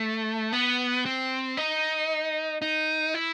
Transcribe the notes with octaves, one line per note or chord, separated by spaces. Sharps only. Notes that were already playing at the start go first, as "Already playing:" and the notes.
Already playing: A3
B3
C4
D#4
D#4
E4